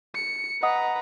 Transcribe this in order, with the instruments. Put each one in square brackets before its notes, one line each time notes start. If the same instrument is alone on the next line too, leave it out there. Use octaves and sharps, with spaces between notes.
[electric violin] C#7
[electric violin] B4 A#5 [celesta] D#5 F#5 D#6